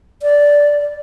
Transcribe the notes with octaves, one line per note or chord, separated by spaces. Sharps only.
D5